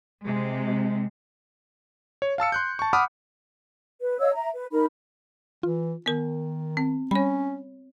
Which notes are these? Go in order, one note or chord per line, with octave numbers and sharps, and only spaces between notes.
C3 G#3
C#5
F5 A5 E6 C#7
C6 F#6 G6
A5 C#6
F#5 B5 D6 D#6 F6
B4
C#5 D#5 F5 E6
E5 A#5
B4
D#4 A#4 B5
E3 F4
D#3 B3 A#4
C4
G3 C#4 C#5 B5